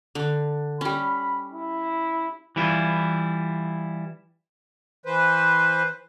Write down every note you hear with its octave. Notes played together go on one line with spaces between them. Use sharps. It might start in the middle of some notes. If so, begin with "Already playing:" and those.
D3
G3 C#4 B5
E4
E3 G3 E4 F4
E3 B4 C5